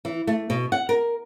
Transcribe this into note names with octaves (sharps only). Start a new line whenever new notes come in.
E3
A3
B2
F#5
A#4